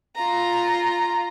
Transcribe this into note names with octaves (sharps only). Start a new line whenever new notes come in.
F4 A#5